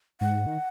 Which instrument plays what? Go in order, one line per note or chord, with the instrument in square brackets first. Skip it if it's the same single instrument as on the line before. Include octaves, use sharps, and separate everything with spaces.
[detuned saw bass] G#2 [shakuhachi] F#5
[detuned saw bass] D#3